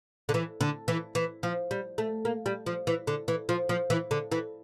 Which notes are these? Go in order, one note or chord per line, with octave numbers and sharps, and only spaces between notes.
D3
E3
D3
E3
E3
F3
G3
A3
A#3
G3
F3
E3
D3
E3
F3
F3
E3
D3
E3